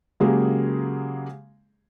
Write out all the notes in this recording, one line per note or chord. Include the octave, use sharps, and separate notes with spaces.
C#3 F#3 G#3 A#3 G4 G#4